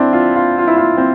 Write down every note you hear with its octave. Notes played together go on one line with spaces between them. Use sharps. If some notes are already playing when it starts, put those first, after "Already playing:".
Already playing: C4 D4 E4
F4
F4
F4
E4
F4
C4